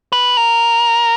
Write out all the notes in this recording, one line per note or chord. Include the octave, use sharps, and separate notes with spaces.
B4
A#4